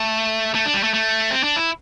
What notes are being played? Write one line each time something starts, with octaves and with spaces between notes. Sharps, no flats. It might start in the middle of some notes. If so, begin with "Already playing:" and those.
Already playing: A3
A3
D4
G3
A3
A3
C4
D4
E4